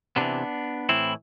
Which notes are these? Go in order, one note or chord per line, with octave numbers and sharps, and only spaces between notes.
C3 E3 B3 D4
A2 E3 C4 E4